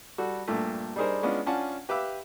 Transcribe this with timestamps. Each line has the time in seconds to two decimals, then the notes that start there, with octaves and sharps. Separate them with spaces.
0.18 G3 F#4 A4
0.48 G2 A#2 A3
0.96 G3 D4 D#4 G#4 A#4 C5
1.23 G#3 B3 C#4 D4 F4
1.46 C#4 D4 F4 F#5 G#5 A5
1.89 G4 B4 E5 F5 D6 E6